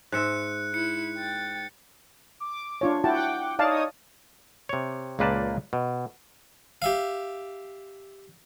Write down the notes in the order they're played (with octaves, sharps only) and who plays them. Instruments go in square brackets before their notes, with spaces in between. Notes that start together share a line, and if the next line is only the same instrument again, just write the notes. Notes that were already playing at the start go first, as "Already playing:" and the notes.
[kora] G#2 E5 [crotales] F#6 C#7
[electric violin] E4 [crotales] C#7
[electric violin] G5 A6
[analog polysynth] D6
[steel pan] D4 F4 C#5
[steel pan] E4 F#4 A5 [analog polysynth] F#5 G5 D6
[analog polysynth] D#4 C#5 D#6 [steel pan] D5 F5 A5
[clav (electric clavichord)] C3 C#5
C#2 A#2 A#3 B4 D5 A5
B2
[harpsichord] G4 E5 F5